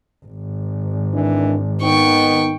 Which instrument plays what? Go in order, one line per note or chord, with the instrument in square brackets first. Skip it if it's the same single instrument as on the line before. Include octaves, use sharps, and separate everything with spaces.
[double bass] G#1
[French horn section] D#3 E3 D4
[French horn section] D#3 B3 D#4 [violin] G5 C#6